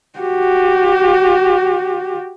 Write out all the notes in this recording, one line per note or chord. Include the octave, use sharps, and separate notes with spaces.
F#4 G4